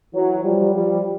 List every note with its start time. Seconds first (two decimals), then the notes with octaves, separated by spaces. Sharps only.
0.13 E3 F#3
0.43 F3 G3
0.73 F3 G3